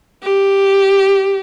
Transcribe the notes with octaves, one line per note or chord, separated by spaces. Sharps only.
G4